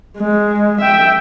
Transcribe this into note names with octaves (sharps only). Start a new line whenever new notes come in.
G#3
E5 G5